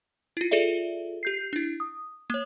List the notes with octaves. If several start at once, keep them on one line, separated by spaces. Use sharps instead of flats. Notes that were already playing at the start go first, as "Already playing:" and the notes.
E4 F4
F4 G#4 A4 D5 E5
G4 G6 C7
D4 E4
D#6
A#3 C#5